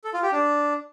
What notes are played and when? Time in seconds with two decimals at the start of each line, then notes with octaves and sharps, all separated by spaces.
0.04 A4
0.13 F4
0.23 G4
0.32 D4